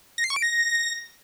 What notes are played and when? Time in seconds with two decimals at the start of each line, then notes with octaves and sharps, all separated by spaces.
0.18 A#6
0.24 C7
0.30 C#6
0.36 D7
0.42 A#6